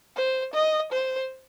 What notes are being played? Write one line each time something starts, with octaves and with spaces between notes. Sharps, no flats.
C5
D#5
C5